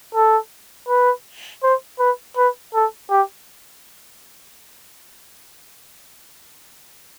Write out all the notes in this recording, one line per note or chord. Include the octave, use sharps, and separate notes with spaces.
A4
B4
C5
B4
B4
A4
G4